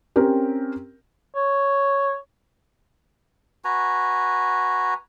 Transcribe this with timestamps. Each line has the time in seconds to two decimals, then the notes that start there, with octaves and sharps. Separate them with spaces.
0.16 C4 C#4 G4 A#4
1.35 C#5
3.64 F#4 B4 G#5 A#5